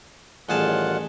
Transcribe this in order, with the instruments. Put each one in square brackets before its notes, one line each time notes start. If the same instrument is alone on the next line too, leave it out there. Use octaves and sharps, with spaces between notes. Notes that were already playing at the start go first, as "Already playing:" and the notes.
[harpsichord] A1 G#4 A5 [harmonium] A2 D#3 G3 [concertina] F4 F#5